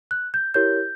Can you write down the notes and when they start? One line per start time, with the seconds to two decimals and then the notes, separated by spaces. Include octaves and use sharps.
0.11 F#6
0.34 G6
0.54 E4 G4 A#4 C#5 G6